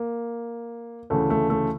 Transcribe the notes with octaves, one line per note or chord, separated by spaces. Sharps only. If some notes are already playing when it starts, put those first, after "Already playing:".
Already playing: A#3
D2 C#3 E3 A3
A3
A3